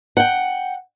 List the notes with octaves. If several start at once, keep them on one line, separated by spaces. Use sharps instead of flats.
F#5 G5